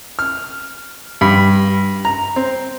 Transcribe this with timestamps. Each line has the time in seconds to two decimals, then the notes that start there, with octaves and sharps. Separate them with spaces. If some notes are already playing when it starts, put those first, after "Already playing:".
0.19 F6
1.21 G2
2.05 A#5
2.36 C4